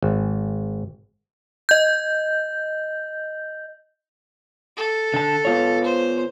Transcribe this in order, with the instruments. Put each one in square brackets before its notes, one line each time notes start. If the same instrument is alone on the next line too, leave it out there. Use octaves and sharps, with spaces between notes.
[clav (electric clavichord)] G#1
[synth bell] D#5 G6
[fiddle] A4
[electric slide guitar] D3 A5
B3 F4 C#5
[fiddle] C5